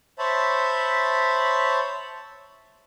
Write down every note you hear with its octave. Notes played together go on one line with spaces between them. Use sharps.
C5 C#5 E5 A5 B5